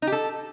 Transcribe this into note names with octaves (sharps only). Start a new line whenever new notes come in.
D#4
G4
A4